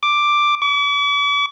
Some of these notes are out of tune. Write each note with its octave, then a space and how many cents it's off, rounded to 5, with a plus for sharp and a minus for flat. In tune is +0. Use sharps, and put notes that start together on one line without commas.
D6 +5
D6 -45